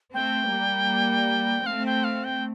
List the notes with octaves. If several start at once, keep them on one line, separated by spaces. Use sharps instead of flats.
A3 C4 G5
G3 A#3
A3 C4 F5
G5
F5
G5